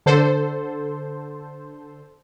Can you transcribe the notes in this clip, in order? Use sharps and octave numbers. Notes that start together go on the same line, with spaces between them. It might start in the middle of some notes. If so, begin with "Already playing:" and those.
D3 A4 C5